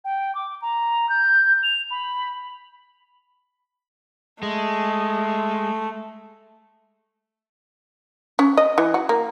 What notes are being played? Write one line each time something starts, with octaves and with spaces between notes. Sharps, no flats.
G5
D6
A#5
G6
F7
B5
G#3 A3
C#4
D#5
E3
F#4
A#3